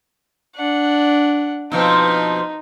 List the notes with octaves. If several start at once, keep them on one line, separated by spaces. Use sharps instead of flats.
D4 F#5
B2 F3 C4 D#4